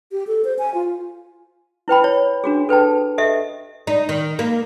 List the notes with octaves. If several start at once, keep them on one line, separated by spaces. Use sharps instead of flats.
G4
A4
C5
G#5
F4
E4 B4 G5 B5
C#5
D4 F#4 G#4
A4 B4 G5 A5
G4 A4 D#5 E5
D#4
D#3
A#3